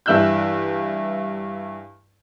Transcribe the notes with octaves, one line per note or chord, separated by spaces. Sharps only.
G2 E3 E4 E6 F#6 G6